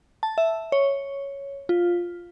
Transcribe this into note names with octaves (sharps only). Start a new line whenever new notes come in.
A5
E5
C#5
F4